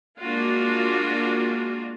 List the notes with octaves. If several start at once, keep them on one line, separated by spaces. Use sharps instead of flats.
G#3 A#3 D4 F4 F#4